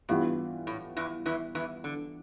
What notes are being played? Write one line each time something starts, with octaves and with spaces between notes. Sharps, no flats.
G2 E3 G3 B3 F4
A2
E2 E3
E2 E3
E2 E3
D3